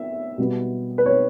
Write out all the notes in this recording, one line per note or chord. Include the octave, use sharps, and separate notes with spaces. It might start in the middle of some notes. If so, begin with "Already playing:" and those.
Already playing: B3 E5
B2 G3 B3
B4
C#5